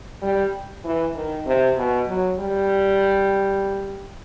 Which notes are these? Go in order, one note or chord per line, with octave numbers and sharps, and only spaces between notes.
G3
E3
D#3
C3
B2
F#3
G3